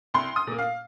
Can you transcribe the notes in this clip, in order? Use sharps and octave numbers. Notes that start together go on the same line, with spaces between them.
C2 C6
D#6
A#2 A#3
F5